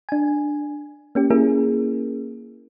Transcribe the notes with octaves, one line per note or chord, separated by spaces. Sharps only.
D4 G#5
A#3 C#4 G4
A#3 C#4 E4 G#4 A#4